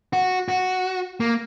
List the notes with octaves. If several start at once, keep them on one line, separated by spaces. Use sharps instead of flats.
F#4
F#4
A#3